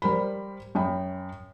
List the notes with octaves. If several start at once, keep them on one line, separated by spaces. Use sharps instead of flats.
G3 A#4 C5 B5
F#2 G5 B5